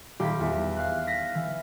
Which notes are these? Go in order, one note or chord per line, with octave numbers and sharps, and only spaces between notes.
D#1 G4 F5 B5
E2
F5 F#6
F6 A#6 B6
E3